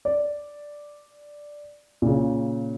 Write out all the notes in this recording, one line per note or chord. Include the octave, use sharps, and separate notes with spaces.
D5
A#2 C#3